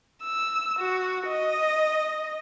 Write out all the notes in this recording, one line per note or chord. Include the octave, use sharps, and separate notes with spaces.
E6
F#4
D#5